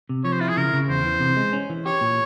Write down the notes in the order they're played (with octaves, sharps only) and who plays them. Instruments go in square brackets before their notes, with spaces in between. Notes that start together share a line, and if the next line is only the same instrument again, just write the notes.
[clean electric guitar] C3
[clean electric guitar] F3 [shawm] C#5
[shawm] C5
[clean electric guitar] E4 [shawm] F4
[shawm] G#4
[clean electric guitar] C#3 [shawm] A#4
[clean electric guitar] C#3
[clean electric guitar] E2 [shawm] C5
[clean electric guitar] E3
C3
G#3
C#4
E3
[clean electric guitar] G4 [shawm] C#5
[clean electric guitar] A#2